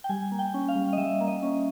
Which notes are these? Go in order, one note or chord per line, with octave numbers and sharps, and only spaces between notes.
G5
G3 G#5
A#3
G5
C#4
F5
G3
D#5
G3 E5
A#3
D#5
C#4